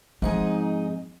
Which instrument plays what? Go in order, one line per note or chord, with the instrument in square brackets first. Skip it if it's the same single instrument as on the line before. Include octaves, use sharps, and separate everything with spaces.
[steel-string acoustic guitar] G#2 D#4 G#4 [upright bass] F3 C4